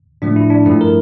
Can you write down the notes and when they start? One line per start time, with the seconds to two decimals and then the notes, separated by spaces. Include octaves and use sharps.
0.22 A2 F3 A3 D4
0.36 E4
0.50 D4
0.66 G2 F3 A3 E4
0.81 A#4